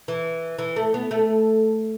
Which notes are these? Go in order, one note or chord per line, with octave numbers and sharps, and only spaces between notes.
E3
E3
A3
B3
A3